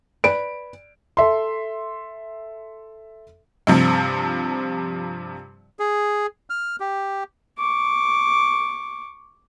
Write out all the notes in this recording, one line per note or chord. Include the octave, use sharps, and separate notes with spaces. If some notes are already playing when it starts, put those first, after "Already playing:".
B4 D5 D7
A4 E5 C6
G2 C3 F3
G#4
F6
G4
C#6 D6